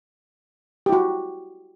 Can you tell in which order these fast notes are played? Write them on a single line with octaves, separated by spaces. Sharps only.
G4 E4 F#4